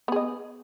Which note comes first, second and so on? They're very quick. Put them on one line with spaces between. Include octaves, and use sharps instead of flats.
B3 G#4 D#5